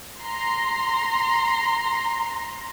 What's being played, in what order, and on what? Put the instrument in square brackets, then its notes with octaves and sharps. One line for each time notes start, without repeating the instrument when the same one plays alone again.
[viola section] A#5 C6